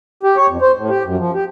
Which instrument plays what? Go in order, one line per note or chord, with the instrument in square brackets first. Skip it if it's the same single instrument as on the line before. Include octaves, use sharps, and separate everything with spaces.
[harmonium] G4
C#5
F2
C5
A2
G4
F#2
F3
G4